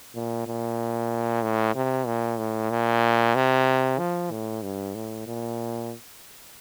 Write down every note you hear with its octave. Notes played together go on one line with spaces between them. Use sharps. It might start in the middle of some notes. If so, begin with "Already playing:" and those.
A#2
A#2
A2
C3
A#2
A2
A#2
C3
F3
A2
G2
A2
A#2